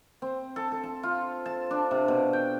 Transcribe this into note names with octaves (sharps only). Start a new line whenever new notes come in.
C4
A4
A4
A5
F4
A5
D4
C3
B2
G5